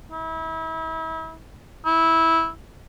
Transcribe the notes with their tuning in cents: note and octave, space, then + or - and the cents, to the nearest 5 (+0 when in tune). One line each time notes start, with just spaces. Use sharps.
E4 -35
E4 -10